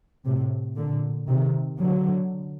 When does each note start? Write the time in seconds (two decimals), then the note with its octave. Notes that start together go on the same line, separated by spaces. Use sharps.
0.25 A2 C3
0.76 A#2 D3
1.28 C3 D#3
1.79 D3 F#3